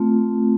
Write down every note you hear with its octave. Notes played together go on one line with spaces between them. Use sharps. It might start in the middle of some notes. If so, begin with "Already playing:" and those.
Already playing: A3 C4 F4